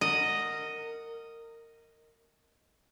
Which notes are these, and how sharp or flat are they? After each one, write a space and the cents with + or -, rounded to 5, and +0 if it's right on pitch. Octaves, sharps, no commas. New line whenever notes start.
A#4 -25 D#5 +0 F#5 +0